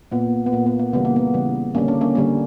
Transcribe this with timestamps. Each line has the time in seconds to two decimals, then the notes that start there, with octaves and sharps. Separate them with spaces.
0.12 A#2 A#3 B3
0.46 B3
0.53 A#2 A#3
0.66 B3
0.79 A#3
0.93 C#3 E3 G3 B3
1.05 A#3
1.16 B3
1.34 C#3 E3 G3
1.75 D3 G3 A#3 C#4
1.88 D4
2.01 A#3 C#4
2.15 D3 G3 A#3